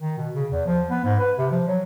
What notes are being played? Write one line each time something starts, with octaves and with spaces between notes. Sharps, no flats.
D#3
B2
C#3
E2
F3
B3
G#2
B4
C3
F3
F#3